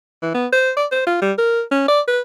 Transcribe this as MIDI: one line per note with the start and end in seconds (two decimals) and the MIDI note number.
0.23 0.32 52
0.35 0.47 59
0.53 0.72 72
0.77 0.86 74
0.92 1.05 72
1.07 1.21 65
1.22 1.33 55
1.38 1.63 70
1.72 1.88 61
1.88 2.01 74
2.08 2.20 71